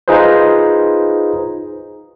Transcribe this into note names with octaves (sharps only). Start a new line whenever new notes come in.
D#4 F4 G#4 B4 C5